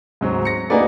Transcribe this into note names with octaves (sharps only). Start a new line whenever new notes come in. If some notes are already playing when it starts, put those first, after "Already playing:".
G#2 F#3 C4
A#6 C#7
A#3 D#4 F#4 G#4 B4 D5